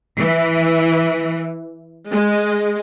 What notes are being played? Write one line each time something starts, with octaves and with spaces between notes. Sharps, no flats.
E3
G#3